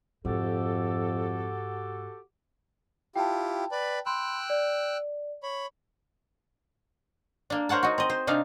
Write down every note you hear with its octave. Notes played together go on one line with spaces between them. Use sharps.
F2 G#2 C3 F#4 G4 A4
E4 F4 G4 G5 A5
B4 D5 B5
G5 B5 C6 E6 F#6
D5
C#5 B5
A#3 D4
A#4 C5 C#5 F#5 A5
D#4 F#4
C4 D#5
C5
C3 D4 D#4 F5